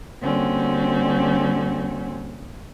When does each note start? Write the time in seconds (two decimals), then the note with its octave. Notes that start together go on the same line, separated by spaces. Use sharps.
0.21 D3 G3 A#3 C4 C#4 F#4